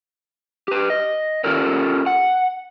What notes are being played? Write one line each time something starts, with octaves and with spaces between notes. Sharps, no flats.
G4 B4
D#5
C#4 F4 G4 A4 A#4 D5
F#5